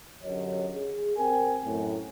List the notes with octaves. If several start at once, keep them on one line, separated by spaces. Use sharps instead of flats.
F#2 D3 F#3 G4 C#5 D#5
G#4
C3 C4 A#4 G5 G#5
F#2 A2